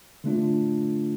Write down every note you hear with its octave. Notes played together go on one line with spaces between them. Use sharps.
D3 A3 D4 F4